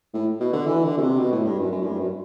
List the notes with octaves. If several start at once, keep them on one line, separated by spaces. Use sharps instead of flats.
A2
B2
D3
E3
D3
B2
C3
B2
A2
G2
F#2
F#2
A2
G2
F#2